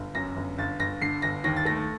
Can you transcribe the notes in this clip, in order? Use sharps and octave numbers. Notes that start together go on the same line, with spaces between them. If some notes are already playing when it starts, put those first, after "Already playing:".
Already playing: G1
F#2 A#6
G1
G1 A6
G1 A#6
D3 C7
G1 A#6
D#2 A#6
A6
A3 A#6